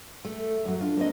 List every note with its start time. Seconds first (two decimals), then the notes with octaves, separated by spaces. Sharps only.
0.25 A3
0.39 A4
0.65 F#2 F#3
0.81 D4 F4
0.97 A#3 C4 D#5